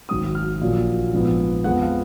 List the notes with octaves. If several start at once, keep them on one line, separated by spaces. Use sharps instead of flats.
G#1 G#2 F#3 D#6
F6
A#1 A#2 F#3 A#3
A#1 G#2 F3 B3
F2 F3 G#3 B3 F#5
F5